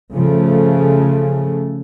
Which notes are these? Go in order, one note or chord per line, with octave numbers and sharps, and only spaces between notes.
C#3 F3 A3